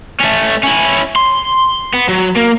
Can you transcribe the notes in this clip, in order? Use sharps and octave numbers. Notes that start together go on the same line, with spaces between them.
A3 C#4
C#4 E4
C6
B3
F#3
A#3